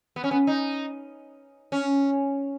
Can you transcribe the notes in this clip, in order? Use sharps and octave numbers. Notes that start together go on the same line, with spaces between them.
B3
C#4
B3
D#4
C#4